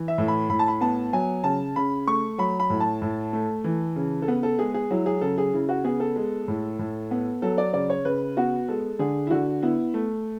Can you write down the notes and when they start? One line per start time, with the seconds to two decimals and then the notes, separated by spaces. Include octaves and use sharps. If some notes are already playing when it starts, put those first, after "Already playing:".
Already playing: E3
0.08 E5
0.18 A2
0.28 B5
0.49 A2 B5
0.59 A5
0.68 B5
0.81 B3 A5
1.13 F#3 G#5
1.44 C#3 A5
1.76 C#3 B5
2.07 A3 C#6
2.38 F#3 B5
2.60 B5
2.70 A2
2.80 A5
3.02 A2
3.33 A3
3.64 E3
3.96 C#3
4.22 A4
4.28 B3 B4
4.43 A4
4.59 G#3 G#4
4.74 G#4
4.91 F#3 E4
5.06 G#4
5.21 C#3 A4
5.38 G#4
5.54 C#3 E4
5.69 F#4
5.84 B3 G#4
6.00 A4
6.16 G#3
6.48 A2
6.79 A2
7.11 B3
7.42 F#3 A4
7.58 D5
7.73 C#3 D5
7.90 C#5
8.05 C#3 B4
8.37 B3 F#4
8.68 G#3 A4
8.99 D3 G#4
9.27 E4
9.31 D3 F#4
9.62 B3 E4
9.94 A3